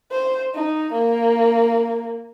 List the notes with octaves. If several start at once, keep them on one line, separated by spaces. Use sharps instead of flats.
C5
D#4
A#3